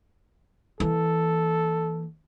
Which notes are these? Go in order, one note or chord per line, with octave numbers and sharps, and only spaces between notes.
E3 A#3 A4